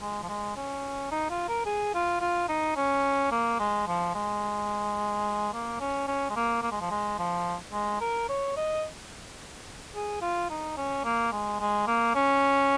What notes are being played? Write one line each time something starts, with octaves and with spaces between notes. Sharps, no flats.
G#3
F3
G#3
C#4
D#4
F4
A#4
G#4
F4
F4
D#4
C#4
A#3
G#3
F3
G#3
A#3
C#4
C#4
G#3
A#3
A#3
G#3
F3
G#3
F3
G#3
A#4
C#5
D#5
G#4
F4
D#4
C#4
A#3
G#3
G#3
A#3
C#4